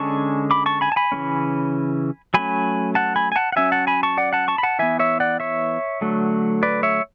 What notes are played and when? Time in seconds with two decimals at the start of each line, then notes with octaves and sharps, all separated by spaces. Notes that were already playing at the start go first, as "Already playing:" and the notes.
Already playing: D3 G#3 C#4 A5 C#6
0.51 B5 D6
0.66 A5 C#6
0.81 G#5 B5
0.92 A5
0.96 G#5 B5
1.12 C#3 E3 A3 C#4
2.34 F#3 A3 C#4 G#5 B5
2.95 F#5 A5
3.16 G#5 B5
3.32 G#5
3.36 F#5 A5
3.52 F#5
3.56 F#3 C#4 E5 G#5
3.72 F#5 A5
3.87 G#5 B5
4.03 A5 C#6
4.17 D5 F#5
4.33 F#5 A5
4.48 A5 C#6
4.58 B5
4.63 F#5 A5
4.79 E3 B3 E5 G#5
4.99 C#5 E5
5.20 D5 F#5
5.40 C#5 E5
6.01 D3 F#3 A3
6.63 B4 D5
6.83 C#5 E5